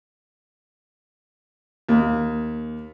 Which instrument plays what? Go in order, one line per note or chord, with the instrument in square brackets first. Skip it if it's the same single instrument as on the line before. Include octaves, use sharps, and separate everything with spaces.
[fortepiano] D#2